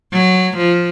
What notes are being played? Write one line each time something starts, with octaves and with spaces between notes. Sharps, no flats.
F#3
F3